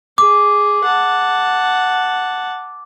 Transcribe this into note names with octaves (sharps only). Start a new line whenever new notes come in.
G#4 D6
F#5 A5